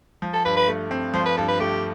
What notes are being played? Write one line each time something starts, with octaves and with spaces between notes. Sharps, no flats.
F3
A4
G2 B4
B4
A3
C4
F3 C5
B4
G2 A4
B4
A3 G4